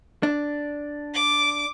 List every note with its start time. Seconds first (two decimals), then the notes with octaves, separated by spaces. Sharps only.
0.23 D4
1.14 D6